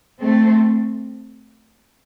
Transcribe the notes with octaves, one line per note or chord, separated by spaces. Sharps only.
A3 C4